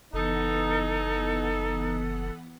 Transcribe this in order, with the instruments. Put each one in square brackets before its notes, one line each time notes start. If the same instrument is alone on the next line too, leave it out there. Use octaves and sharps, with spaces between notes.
[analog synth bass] F#1 [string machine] E3 B3 F#5 [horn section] D#4 [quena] A4